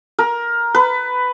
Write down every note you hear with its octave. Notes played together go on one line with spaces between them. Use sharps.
A#4
B4